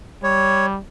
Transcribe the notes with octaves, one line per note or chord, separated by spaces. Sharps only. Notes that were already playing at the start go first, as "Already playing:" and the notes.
G3 C#5